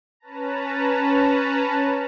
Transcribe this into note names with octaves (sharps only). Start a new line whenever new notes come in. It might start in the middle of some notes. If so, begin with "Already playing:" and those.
C#4 B4 A5 A#5